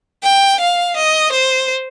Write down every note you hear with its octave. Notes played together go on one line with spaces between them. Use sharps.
G5
F5
D#5
C5